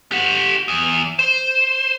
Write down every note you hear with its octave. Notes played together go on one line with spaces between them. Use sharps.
G4 F#5
E2
C5